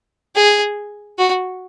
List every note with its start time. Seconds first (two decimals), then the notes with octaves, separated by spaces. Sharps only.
0.36 G#4
1.18 F#4